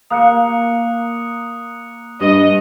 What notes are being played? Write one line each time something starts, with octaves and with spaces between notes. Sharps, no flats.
A#3 D#6 F#6 C#7
G2 D#5 D#6